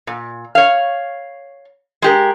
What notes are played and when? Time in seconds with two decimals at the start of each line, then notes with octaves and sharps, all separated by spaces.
0.07 A#2
0.55 C#5 F5
2.02 G#3 G4 A#4